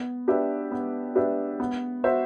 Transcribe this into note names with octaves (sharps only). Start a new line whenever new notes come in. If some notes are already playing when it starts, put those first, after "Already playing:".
Already playing: B3
D4 G4 B4 E5
B3
D4 G4 B4 E5
B3
F#4 C5 E5